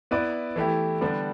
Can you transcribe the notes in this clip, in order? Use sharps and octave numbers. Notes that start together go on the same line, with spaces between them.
B3 E4 B4 D5
E3 A3 E4 G4
D3 G3 B3 D4